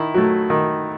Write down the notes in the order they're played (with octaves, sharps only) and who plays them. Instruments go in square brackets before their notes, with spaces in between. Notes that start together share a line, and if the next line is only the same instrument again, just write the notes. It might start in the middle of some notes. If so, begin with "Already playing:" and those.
Already playing: [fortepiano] D#3 E4
F#3 A3
D#3